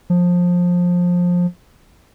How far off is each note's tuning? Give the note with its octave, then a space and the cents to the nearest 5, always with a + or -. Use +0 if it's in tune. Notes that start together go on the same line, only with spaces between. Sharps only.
F3 +20